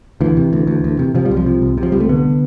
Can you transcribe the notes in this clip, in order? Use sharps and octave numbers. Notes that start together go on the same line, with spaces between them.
D2 E3
C3
D2
D2
D2
C3
C3 F3
G3
C2
F3
C3
C2
C3
F3
C2 G3
A3
D3 B3